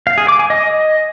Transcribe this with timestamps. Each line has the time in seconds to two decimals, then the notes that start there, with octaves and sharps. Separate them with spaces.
0.07 F5
0.18 G#4
0.28 D6
0.39 G#5
0.50 D#5